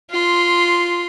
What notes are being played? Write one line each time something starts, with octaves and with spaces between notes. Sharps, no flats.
F4 C6